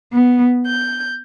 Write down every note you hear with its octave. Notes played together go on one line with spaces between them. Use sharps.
B3
G6